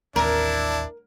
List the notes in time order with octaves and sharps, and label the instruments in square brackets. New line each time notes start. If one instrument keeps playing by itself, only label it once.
[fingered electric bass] A1 D#2 C4 [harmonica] D4 E4 [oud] A#4